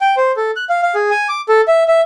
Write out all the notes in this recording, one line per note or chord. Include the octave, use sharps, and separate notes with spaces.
G5
C5
A4
F#6
F5
F5
G#4
G#5
D6
A4
E5
E5